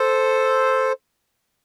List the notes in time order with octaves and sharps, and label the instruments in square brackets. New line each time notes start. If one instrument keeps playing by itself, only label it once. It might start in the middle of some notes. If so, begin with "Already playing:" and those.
Already playing: [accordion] A4 C5